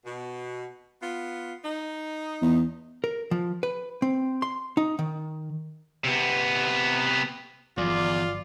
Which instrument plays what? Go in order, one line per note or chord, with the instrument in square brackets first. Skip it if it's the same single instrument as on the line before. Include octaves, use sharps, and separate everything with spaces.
[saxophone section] B2
B3 F4
D#4
[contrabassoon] E2
[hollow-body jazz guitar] A#4
F3
B4
C4
C6
D#4
D#3
[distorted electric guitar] C3 B3
[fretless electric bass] G1 F3 F#3 [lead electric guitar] E2 [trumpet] F4 [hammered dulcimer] D5